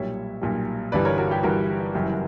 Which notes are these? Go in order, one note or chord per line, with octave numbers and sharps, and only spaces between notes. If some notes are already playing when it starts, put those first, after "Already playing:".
Already playing: B1 A#2 G3 C#5 E5
B1 A#2 G3
G1 G2 E3 G3 B4 D5
A#4 C#5
F#4 A#4
G4
G1 G2 E3 G3 F#4 A#4
F#1 F#2 E3 G3